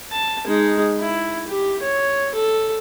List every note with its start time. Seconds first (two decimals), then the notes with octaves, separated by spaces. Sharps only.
0.12 A5
0.47 G#3 D#4
1.00 E4
1.48 G4
1.82 C#5
2.35 A4